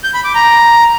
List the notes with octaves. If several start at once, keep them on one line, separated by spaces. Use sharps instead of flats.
G6
B5
D6
A#5